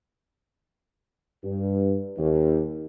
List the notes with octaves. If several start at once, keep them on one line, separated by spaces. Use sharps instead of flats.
G2
D#2